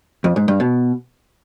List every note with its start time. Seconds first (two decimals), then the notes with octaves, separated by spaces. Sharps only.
0.24 F2
0.36 G#2
0.48 G2
0.60 B2